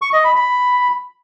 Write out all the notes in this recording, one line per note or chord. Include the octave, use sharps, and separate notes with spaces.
C#6
D#5
B5
B5